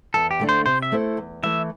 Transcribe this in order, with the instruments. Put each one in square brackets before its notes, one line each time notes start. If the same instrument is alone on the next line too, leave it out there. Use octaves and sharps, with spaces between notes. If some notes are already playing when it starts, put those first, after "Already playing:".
[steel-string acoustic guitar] E2 [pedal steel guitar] A4
[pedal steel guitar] G4
[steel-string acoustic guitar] D3 A3 D4
[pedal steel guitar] C5
[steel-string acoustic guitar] C3 [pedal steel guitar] C5
[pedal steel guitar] E5
[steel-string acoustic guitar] A3 E4 A4 C5
E2
[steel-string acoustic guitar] E3 A3 [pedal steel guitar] E5